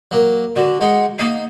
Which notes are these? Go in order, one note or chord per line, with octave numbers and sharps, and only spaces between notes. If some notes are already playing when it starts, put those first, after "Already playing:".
F#3 A#3
D3 F#4
G#3 D#4 F#5
A#3 D#4